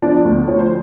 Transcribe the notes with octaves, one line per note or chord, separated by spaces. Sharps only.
F3 D4 D5
D2
F3 C#5
C5